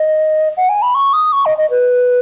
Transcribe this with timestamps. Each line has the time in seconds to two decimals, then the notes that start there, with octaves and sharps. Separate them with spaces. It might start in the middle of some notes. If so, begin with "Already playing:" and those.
Already playing: D#5
0.57 F#5
0.69 G#5
0.82 B5
0.95 C#6
1.13 D#6
1.33 C#6
1.46 D#5
1.58 D#5
1.70 B4